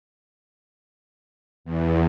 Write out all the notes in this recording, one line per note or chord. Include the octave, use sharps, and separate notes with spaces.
E2